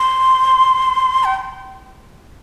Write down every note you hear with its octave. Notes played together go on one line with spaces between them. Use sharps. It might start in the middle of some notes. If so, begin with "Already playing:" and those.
Already playing: C6
G5